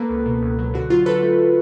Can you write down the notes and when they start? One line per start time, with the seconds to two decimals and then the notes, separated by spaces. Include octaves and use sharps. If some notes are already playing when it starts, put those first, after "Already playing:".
Already playing: A#3 A4 B4
0.09 C#2
0.25 B2
0.42 C#2
0.59 F#3
0.74 D3 F#4
0.90 F#3 F4
1.06 D3 A4 B4
1.23 A3